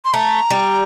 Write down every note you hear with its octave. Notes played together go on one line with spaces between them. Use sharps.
C6
A3 A#5
G3